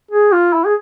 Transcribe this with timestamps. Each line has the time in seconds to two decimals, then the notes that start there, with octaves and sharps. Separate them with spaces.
0.11 G#4
0.32 F4
0.53 E4
0.65 G#4